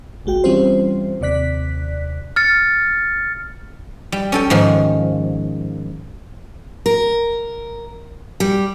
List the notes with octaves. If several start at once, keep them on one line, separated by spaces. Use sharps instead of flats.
G1 C2 G#3 F#4 G5
E3 G3 C4 C#4 F4 C5
D#2 C3 D5 F#6 B6
F6 A6 C#7
G3
C#4 A4 G5
G#2 D#3 F3
A#4
G3